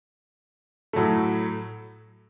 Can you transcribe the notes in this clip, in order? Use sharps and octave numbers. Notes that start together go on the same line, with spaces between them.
A2 F#3 A3